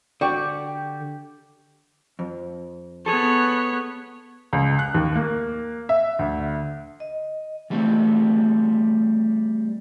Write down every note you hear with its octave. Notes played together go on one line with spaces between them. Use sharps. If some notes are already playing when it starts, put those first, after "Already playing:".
D3 F#4 G4 D5 C#6 D6
F2
B3 G#4 A4 C#5
C#2
F#6
D#2
A#3
E5
D2
D#5
E3 G3 A3 C4